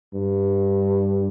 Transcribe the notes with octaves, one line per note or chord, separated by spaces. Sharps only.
G2